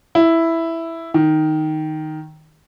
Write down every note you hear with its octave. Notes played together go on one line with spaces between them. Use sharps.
E4
D#3